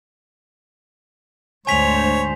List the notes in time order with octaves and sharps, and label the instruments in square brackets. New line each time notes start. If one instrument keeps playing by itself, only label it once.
[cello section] D2 G#2 C5 [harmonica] C#5 [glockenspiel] G#5 B6 F7